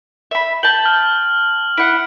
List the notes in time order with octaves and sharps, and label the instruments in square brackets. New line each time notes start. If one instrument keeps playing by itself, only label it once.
[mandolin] E5 B5
[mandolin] G5 A5 [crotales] F#7
[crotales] F6
[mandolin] E4 F#5 [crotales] D7